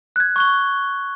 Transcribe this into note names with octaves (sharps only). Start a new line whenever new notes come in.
F#6 G#6
C#6 F#6 G7